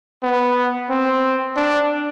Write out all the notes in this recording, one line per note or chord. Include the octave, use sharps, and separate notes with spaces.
B3
C4
D4